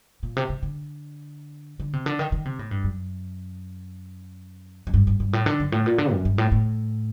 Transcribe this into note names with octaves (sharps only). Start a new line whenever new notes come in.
A#2
C3
C3
D3
D3
C3
D3
D#3
D#3
C3
A2
G2
F#2
F#2
G2
G2
G2
A2
D3
F#2
A2
A#2
D3
F#2
G2
A2
A2